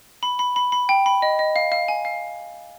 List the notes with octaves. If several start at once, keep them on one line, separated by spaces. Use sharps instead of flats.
B5
B5
B5
B5
G5
B5
D#5
D#5
F5
F5
G#5
F5